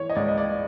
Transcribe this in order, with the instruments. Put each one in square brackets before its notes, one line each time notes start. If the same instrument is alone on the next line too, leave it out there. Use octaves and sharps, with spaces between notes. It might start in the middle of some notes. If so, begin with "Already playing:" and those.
Already playing: [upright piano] E3 C#5
D#5
C#2 D5
D#5
D5